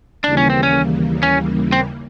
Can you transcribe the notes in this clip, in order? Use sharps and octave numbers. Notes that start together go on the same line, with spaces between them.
D#2 C#3 E3 G3 A#3 D4
C#4
C4
C#4
C#4
C4